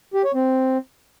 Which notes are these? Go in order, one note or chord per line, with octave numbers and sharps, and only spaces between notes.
G4
C#5
C4